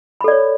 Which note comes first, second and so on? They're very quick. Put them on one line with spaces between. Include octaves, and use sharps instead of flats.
B5 A4 D5 C#5